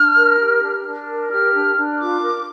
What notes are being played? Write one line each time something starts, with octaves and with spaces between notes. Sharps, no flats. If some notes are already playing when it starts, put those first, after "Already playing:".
Already playing: D4 F6
A#4
G4
D4
D4
A#4
G4 F6
D4
D4
F4 D6
A#4